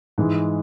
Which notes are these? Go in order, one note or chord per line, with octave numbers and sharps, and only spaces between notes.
G#2 E3 G#3